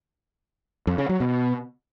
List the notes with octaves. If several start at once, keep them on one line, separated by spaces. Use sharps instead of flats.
F2
C#3
F#3
B2